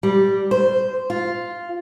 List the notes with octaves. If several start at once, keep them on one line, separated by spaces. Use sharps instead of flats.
G3
C5
F4